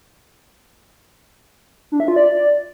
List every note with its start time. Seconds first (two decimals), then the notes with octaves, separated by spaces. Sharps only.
1.92 D4
2.00 E5
2.08 F4
2.16 D5